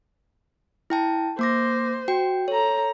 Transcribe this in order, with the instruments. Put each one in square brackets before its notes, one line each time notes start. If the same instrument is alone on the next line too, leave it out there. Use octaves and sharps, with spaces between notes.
[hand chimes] E4 G5 A5
[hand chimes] A#3 D6 A#6 [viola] C5
[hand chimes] F#4 G5
[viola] A4 A#5 [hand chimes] C#5